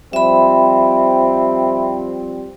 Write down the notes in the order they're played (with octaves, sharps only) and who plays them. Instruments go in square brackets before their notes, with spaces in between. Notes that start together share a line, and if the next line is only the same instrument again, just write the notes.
[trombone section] F3 G3 C4 [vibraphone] E5 B5